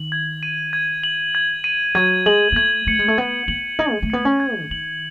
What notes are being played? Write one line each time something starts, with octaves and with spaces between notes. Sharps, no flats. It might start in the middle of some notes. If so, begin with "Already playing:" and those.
Already playing: D#3 F#7
G#6
D#7
G#6
F#7
G#6
D#7
F#3 G#6
G#3 F#7
B3
A3 G#6
A3 C#7
G#3
A3
B3 G#6
B3 F#7
D#4 G#6
G#3
A3
B3 C#7
C#4
G#6
C#3
D#3 F#7